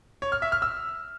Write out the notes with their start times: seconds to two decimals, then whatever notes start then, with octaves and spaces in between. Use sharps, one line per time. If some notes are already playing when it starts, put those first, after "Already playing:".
0.22 C#5
0.32 F6
0.42 E5
0.52 F6
0.62 E6